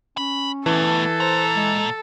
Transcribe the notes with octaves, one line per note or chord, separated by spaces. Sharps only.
C#4 B5
E3 A3 B3 A4
A#2 C5 A#5
G#3